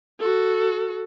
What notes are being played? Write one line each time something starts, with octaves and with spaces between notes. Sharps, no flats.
F#4 A4